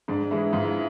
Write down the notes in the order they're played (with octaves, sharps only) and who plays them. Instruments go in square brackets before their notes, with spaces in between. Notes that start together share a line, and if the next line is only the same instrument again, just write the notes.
[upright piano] G#2 [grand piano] D4
[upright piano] E3 G#3 [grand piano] E4
[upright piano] G#2 [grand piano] F4
[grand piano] E4